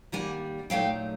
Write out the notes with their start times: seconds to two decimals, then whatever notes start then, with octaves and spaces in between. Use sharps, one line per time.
0.12 D#3 G3 A#3 D4 F#5 G#5
0.70 A#2 F#3 A3 D#4 F5 G5